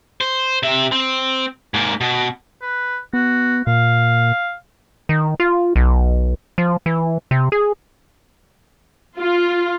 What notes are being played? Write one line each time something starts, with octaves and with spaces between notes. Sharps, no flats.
C5
C3 E5
C4
G#2 A#3
B2
B4
B3 F#4
A#2 F5
D#3
F4
B1
F3
E3
C3
G#4
F4